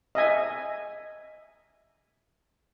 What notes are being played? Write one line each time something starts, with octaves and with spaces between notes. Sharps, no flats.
D#5 E5 G#5